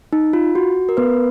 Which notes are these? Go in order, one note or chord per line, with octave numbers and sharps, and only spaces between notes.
D#4
F4
F#4
A#4
B3 B4